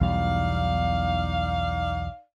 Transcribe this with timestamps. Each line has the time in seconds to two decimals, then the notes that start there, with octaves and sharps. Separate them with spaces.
0.01 B1 E2 G3 D#4 D5 F5